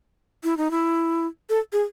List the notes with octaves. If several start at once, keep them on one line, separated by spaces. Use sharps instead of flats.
E4
D#4
E4
A4
G#4